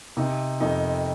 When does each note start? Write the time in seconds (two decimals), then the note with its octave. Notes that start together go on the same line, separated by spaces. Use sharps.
0.17 C3 D#4
0.60 F2 D#4